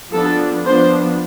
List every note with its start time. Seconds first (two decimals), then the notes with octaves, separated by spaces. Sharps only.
0.13 F3 B3 D4 A4
0.66 F3 B3 D4 C5